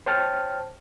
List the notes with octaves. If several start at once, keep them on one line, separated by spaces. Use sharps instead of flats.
C5 C#5 G5 A5 F6